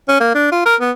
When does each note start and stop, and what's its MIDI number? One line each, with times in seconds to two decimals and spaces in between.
0.08 0.20 61
0.20 0.33 58
0.35 0.48 62
0.52 0.62 65
0.66 0.76 70
0.80 0.91 59